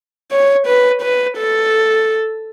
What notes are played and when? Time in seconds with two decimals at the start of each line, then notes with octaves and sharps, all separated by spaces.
0.32 C#5
0.67 B4
1.02 B4
1.38 A4